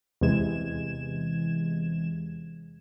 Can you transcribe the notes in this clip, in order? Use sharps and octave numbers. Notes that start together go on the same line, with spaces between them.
E2 C3 E3 G#3 G#6 E7